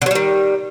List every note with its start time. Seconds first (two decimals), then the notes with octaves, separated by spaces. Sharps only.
0.02 D3
0.06 F#3
0.11 G3
0.15 D#3